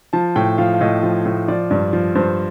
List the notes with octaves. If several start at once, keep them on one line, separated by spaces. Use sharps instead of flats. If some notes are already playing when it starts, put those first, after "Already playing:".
F3 A5
A2 G5
F3 F5
F5
A2 D#5
F3
A2
F3 D5
G2
F3
G2 C5